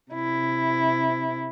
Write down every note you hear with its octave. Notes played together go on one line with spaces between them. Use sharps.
C3 E4